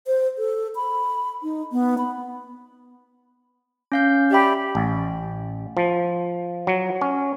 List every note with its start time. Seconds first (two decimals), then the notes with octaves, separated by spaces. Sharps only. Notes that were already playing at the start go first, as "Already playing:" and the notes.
0.07 C5
0.38 A4
0.75 B5
1.43 D#4
1.72 B3
1.98 B5
3.92 C#4 F5 G6
4.31 G4 D5 E5 B5
4.75 A1
5.77 F3
6.67 F#3
7.01 C#4